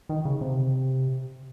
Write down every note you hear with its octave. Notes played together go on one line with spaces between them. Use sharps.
D#3
C#3
C3